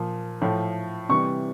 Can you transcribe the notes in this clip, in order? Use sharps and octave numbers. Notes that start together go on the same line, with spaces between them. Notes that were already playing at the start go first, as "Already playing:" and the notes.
Already playing: A#2 F3
A2 F3
C3 E3 G3 C#6